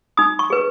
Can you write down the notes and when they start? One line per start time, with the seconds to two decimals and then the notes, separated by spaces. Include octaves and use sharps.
0.17 D#4 D#6
0.39 C#6
0.50 G#4 B4